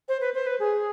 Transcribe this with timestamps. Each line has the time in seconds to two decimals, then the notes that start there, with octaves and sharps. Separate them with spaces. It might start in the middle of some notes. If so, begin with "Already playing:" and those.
0.09 C5
0.21 B4
0.34 C5
0.47 B4
0.60 G#4